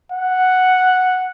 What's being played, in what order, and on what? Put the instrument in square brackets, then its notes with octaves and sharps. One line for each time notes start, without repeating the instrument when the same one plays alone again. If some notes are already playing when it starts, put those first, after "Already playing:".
[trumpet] F#5